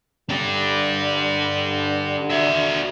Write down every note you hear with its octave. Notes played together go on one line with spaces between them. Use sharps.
D3 D4 G4
F#4 E5